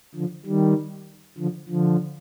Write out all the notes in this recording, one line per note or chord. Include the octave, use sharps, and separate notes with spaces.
D3 F3
D#3 G3
D3 F3
D3 F3